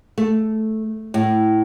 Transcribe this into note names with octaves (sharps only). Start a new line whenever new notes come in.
A3
A2